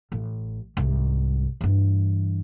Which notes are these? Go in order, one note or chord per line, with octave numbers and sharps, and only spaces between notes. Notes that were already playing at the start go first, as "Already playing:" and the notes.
A1
C2 G#2
G2 E3